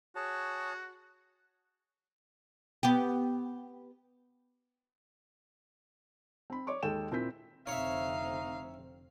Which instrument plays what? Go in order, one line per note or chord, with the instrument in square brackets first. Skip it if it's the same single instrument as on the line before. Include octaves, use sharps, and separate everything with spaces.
[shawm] F#4 [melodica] G#4 C#5 A5
[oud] B3 G4
[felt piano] C4 B5
C#5 D5 C#6 D6
D#2 G#3 A4 G5 E7
A#2 C4 E4 A#4 G6 B6
[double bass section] F1 D3 C4 [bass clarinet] D#4 [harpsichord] C#5 E5 [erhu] F5